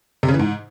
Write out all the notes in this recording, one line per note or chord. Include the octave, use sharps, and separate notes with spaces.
C3
C#3
E3
G#2